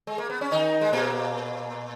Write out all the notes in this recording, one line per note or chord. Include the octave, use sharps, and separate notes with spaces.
G#3
A#3
B3
C#4
D#3 D#4
G#3
A#2 A#3